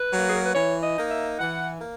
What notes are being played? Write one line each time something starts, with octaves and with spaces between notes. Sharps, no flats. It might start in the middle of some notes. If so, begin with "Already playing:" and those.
Already playing: B4
F#3 A#3
G#4
A#4
B4
E3 C#5
D#5
A#3 D#4
E5
E3 F#5
A#3